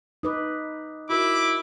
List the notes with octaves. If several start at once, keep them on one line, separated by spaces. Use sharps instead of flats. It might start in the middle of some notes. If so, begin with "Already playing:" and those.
D#4 B4 D6 D#6
E4 F#4 A#4 D6